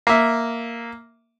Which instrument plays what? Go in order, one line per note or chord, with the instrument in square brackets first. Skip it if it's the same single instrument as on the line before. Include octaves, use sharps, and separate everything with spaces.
[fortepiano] A#3 E5